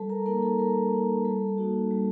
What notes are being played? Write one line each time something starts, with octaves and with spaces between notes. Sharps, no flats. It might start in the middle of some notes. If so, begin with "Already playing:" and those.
Already playing: G3 A4 A5
A#4 A#5
A#3 D#4 A#4 A#5
A4 A5
G3 A#4 A#5
A#3 D#4
G3 A4 A5
A#3 D#4 F#4
G3